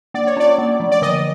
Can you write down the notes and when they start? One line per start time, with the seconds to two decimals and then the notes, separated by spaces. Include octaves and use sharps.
0.14 A#3 D5
0.27 C#5
0.37 C#4 D5
0.58 A#3
0.80 F3
0.91 D5
1.02 D3 D#5